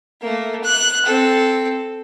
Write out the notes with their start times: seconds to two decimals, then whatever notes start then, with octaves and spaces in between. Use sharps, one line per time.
0.22 A3 A#3
0.64 F#6
1.06 C4 A4